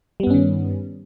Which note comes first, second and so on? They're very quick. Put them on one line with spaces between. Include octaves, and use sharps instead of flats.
G3 B3 G2 C#4 D#3